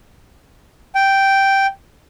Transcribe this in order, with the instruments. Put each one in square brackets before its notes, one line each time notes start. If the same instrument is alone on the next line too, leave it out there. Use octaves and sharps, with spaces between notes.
[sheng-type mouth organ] G5